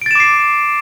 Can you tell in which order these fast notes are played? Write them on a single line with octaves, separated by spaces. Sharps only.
D7 A6 E7 D6 C7